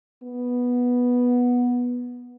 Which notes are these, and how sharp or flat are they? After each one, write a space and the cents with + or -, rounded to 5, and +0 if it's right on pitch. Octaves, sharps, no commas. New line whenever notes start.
B3 -10